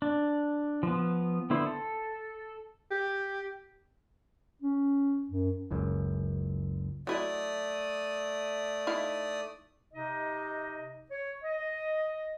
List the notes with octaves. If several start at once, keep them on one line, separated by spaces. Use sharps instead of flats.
D4
F3 B3
D3 B3 E4 C5
A4
G4
C#4
F#2
F#1 C#2 F#2
F#3 A3 E4 D5 D#5 D#6
D#4 E4 F5
C3 D#4 D#5
C#5
D#5